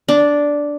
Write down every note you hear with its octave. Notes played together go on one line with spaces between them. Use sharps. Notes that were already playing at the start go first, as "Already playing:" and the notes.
D4